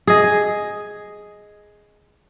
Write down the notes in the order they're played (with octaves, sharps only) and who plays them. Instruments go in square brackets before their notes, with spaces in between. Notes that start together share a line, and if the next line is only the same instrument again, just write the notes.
[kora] G#4 D#5